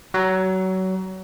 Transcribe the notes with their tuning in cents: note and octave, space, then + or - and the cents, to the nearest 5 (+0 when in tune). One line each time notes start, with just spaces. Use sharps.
F#3 +25